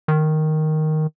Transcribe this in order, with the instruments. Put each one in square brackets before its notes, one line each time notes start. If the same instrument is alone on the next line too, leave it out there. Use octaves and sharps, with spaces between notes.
[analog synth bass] D#3